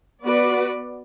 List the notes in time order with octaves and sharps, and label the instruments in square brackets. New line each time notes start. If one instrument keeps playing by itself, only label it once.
[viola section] B3 F#4 B4 D5